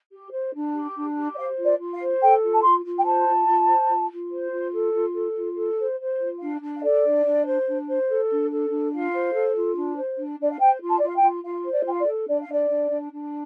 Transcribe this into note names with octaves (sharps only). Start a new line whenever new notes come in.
G4
C5
D4
G4
D4
G4
D5
C5 F5
F4
D5
F4
F5
C5
A4 G5
F4
A5
F4 C6
F4
G5
C5 A5
F4
F4
C5
F4
F4
C5
F4
A4
F4
A4
F4
A4
C5
C5
F4
D4 F5
D4
F5
A4 D5
D4
D4
C5
D4
C5
A4
D4
A4
D4
F4 F5
C5
A4
F4
D4
C5
D4
D4 D5
F5
C5 G5
F4
A5
D5
F4
F5
G5
F4
F4 F5
C5
D5
F4 G5
F5
D5
A4
D4 D5
F5
D4 D5
D4
D4
D4